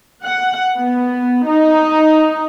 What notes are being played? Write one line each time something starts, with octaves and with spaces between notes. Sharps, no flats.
F#5
B3
D#4